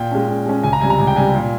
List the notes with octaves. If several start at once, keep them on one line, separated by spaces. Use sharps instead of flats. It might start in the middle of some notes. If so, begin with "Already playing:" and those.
Already playing: A#2 G5
G#3 C#4
A#2
G#3 C#4
C#2 G#5
A#5
C3 G3 G#5
A#5
C#2 G#5
G5
C3 G3 G#5
A#2